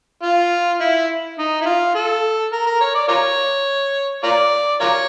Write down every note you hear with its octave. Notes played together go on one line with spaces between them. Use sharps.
F4
E4
D#4
E4
F4
A4
A#4
A#4
C#5
D5
F4 A#4 C#5
F4 A#4 D5
F4 A#4 C#5